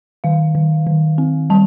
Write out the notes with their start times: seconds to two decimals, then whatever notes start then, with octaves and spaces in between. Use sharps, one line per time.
0.24 D#3 F5
0.55 D#3
0.87 D#3
1.18 C4
1.50 G3 A5